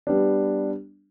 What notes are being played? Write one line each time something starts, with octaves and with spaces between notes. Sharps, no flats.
G3 B3 D4